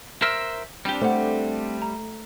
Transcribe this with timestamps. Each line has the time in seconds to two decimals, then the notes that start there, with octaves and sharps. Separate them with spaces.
0.22 A#4 C5 E5 F6
0.85 G3 C4 D4 G4
1.01 A3 C5 F#5
1.82 A#5